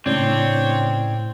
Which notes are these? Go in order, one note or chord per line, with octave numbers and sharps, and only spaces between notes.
A2 C#3 C4 D4 C#5 D5